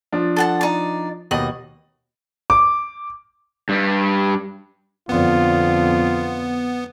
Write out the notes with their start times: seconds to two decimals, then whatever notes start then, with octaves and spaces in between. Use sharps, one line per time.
0.12 F3 D4
0.36 A4 F#5 A5
0.61 D#4 D5
1.31 D#2 B2 D#5 F#7
2.50 D6
3.69 G2 G3
5.09 F2 D3 B3 F4